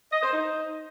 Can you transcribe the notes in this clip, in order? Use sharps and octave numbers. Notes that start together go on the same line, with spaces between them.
D#5
C5
D#4